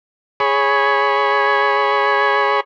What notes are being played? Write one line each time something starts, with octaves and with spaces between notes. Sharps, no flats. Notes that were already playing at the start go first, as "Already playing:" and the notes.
G#4 C#5 B5